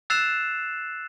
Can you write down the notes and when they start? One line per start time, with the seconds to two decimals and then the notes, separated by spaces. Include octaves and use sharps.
0.10 E6 F#6 A6 C7 E7 F7